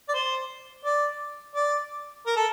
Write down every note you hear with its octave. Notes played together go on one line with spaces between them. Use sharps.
D5
C5
D5
D5
A#4
A4